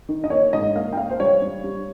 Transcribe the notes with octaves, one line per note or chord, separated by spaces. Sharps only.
D#3
D#5
A#3 C#5
G#2 D#5
A#3 F5
G5
A#3 F5
C5
G3 C#5
G3
G3